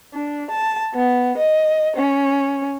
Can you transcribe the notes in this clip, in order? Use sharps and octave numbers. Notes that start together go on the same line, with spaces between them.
D4
A5
B3
D#5
C#4